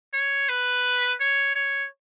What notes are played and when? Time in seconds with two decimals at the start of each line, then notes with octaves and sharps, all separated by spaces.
0.14 C#5
0.49 B4
1.20 C#5
1.55 C#5